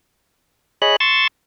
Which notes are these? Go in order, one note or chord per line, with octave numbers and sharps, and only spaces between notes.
G#4 C#5 D#5 B5 F#6
C6 C#6 E6 A6